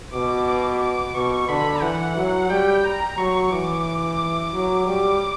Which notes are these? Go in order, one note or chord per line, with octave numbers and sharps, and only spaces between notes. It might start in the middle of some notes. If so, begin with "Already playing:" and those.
B2 D6
D6
D6
B2 C#6
D3 B5
E3 F#5
F#3
G3 G5
A#5
F#3 C#6
E3 D6
D6
F#3
G3 D6